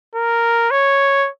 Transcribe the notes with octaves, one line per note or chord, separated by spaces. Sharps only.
A#4
C#5